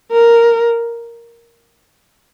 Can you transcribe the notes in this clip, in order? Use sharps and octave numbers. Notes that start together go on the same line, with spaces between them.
A#4